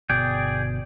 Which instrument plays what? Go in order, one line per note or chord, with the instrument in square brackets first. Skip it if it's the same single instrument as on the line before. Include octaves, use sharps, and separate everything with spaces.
[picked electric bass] G1 B2 [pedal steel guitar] G#4 D5 G5